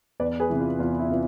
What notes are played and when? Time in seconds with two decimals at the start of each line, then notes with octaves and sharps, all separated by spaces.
0.20 E2 B4 D5
0.40 G#4 B4
0.50 C3 E3
0.60 F4
0.79 E2 F4
0.99 E4
1.09 C3 E3 F4